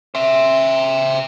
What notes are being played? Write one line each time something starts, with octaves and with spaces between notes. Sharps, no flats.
C5 E5